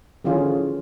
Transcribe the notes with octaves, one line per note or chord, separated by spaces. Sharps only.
D3 E3 F3 C#4 F4 G#4